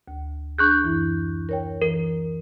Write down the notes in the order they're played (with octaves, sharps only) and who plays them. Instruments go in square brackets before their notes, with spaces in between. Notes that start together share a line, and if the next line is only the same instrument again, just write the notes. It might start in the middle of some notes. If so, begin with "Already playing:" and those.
[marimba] D2
[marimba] D4 G#4 [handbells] C#6 F#6 G6
[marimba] F#2 E3 E4
A#4 C#5 G5
[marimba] E3 [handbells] A#4